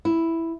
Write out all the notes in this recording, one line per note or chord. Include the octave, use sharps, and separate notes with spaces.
E4